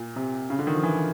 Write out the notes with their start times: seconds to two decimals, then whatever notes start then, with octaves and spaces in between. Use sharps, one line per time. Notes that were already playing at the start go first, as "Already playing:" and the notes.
Already playing: A#2
0.16 C3
0.50 C#3
0.59 D3
0.67 D#3
0.75 F3
0.83 E3